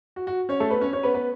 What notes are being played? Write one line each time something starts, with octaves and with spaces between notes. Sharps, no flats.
F#4
F#4
C#4 C#5
A3 A4
B3 B4
C#4 C#5
C#4 C#5
B3 B4
B3 B4